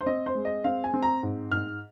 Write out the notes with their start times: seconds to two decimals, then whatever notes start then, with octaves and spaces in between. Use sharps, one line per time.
0.01 C5
0.06 C4 D#5
0.26 C5
0.35 G#3
0.45 D#5
0.64 C4 F5
0.84 G#5
0.94 C4
1.02 A#5
1.23 G#2
1.51 G#2 F6